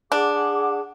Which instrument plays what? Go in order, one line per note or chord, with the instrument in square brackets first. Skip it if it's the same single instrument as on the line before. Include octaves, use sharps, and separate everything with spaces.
[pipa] D4 [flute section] G#4 F#5 D6